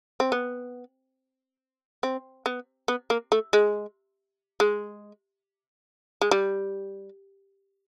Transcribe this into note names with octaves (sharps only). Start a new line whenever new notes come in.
C4
B3
C4
B3
B3
A#3
A3
G#3
G#3
G#3
G3